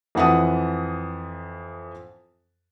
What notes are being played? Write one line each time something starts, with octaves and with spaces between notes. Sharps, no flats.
F2 E3 F#5 A5 D#6